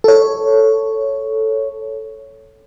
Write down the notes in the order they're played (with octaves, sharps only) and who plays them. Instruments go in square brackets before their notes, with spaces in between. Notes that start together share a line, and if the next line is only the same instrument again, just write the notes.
[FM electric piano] A4 C#5